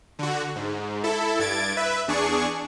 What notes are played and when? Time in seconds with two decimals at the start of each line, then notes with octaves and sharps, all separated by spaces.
0.19 D3 F#4
0.56 G#2
1.04 E4 A4
1.39 G2 G#6 A6 D7
1.77 B4 E5
2.08 E2 D4 G#4 C#6